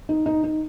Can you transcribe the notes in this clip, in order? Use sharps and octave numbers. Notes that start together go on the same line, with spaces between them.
D#4
D#4
D#4